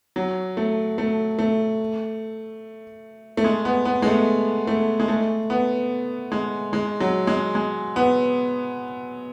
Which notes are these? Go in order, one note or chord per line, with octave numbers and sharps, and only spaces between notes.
F#3
A3
A3
A3
A3
G#3
B3
B3
G#3
A3
A3
G#3
A3
B3
G#3
G#3
F#3
G#3
G#3
B3